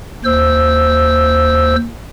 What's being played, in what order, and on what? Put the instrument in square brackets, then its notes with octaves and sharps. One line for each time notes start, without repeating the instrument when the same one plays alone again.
[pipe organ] D#2 C5 E6